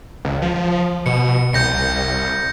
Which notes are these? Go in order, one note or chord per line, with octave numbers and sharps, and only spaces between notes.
C#2
F3
B2 C#7
C2 G6 A#6 C#7